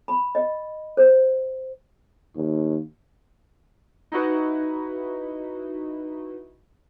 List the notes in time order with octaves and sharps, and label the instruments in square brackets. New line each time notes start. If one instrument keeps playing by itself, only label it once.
[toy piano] B5
D#5
C5
[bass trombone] D#2
[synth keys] D#4 E4 F#4 B4